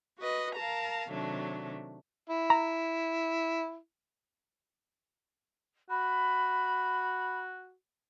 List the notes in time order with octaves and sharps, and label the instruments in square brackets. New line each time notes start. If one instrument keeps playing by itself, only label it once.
[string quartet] F#4 B4 D#5
A#4 F5 A5 A#5
C3 D#3 F#3 A3 D4
[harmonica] E4
[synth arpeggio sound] A#5
[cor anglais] F#4 [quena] B5